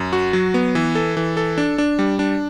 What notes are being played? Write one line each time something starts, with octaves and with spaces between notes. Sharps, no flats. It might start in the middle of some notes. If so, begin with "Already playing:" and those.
Already playing: F#2
F#4
F#3
B3
E3
A4
E3
A4
D4
D4
G3
D4